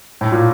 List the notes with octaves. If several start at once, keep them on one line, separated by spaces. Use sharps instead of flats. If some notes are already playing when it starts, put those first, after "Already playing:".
A2
A#2